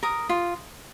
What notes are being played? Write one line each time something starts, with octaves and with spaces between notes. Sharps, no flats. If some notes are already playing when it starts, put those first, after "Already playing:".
A#4 D#6
F4